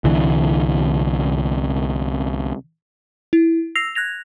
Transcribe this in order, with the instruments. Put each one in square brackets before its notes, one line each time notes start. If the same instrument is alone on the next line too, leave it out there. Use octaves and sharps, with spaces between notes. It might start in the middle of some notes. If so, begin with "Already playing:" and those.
[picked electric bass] C2 D3 E3
[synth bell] E4
E6 A#6 C7 F7
F#6 G#6 A#6 F7